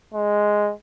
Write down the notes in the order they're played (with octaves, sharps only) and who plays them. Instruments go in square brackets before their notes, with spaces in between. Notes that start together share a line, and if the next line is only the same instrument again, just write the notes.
[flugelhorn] G#3